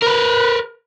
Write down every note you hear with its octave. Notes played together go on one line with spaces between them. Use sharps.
A#4 B4